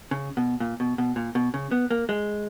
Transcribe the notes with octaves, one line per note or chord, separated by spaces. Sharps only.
C#3
B2
A#2
B2
B2
A#2
B2
C#3
B3
A#3
G#3